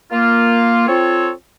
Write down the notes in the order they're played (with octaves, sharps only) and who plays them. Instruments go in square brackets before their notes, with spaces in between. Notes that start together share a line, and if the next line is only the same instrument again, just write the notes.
[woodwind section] A#3 F4
C4 F4 A4 C#5